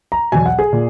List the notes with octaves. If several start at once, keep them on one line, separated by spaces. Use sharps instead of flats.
A#5
E2 B2 F#3 G#5
F#5
G#4
A#2